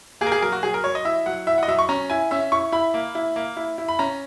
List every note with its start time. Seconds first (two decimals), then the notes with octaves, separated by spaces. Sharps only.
0.21 A#3 G#4
0.27 A#4
0.32 G#4
0.42 F#3 A#4
0.52 F#4
0.63 F#3 G#4
0.74 A#4
0.84 F#3 C#5
0.95 D#5
1.05 E4 E5
1.26 F#3 F#5
1.47 E4 E5
1.58 F#5
1.63 D#5
1.68 F#3 E5
1.79 C#6
1.89 C#4 A#5
2.10 E4 G#5
2.31 C#4 E5
2.52 E4 C#6
2.72 E4 B5
2.94 A#3
3.15 E4
3.36 A#3
3.57 E4
3.78 E4
3.88 B5
3.99 C#4 A#5